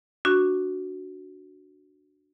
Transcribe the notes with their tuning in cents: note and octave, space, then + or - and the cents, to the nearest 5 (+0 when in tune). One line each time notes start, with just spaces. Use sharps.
D4 +0 F#4 +0 C#6 +5